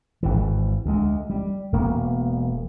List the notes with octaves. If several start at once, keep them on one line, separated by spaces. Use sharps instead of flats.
G#1 E3
D2 G#3
G3
E1 A#3 B3